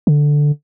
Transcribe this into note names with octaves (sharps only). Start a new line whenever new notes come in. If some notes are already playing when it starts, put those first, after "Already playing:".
D3